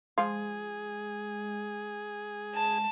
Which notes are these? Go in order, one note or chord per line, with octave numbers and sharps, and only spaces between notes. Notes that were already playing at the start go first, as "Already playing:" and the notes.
F3 G#3 F4 G#4
A5